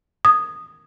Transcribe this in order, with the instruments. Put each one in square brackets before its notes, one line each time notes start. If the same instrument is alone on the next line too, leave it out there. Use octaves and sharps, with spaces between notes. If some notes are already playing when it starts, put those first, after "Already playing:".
[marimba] D#6